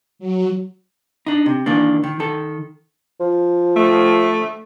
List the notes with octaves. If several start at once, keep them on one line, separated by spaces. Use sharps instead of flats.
F#3
D4 D#4
C3
D#3 E3 A#3 D4
D#3
D#3 A4
F3
A3